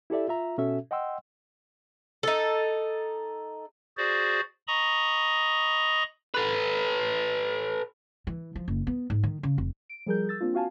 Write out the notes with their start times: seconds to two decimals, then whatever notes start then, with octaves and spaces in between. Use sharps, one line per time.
0.10 E4 G4 A4 D5 E5
0.28 F4 E5 A#5
0.58 B2 C#4 F#4 A4 E5
0.91 D#5 F#5 G5 C6 E6
2.23 D#4 A4
3.97 F#4 G#4 C5 D5
4.68 D#5 A#5 B5 C#6 D#6
6.34 A4 B4
8.27 E3
8.56 F3
8.68 F#1
8.87 B3
9.10 G#2
9.23 D#3
9.43 C#3
9.58 F1
9.89 D7
10.06 F3 G3 G#4 A#4 G6
10.29 E6 A6
10.41 A#3 C4 D4 F4
10.54 C4 F#4 F5 G#5 A5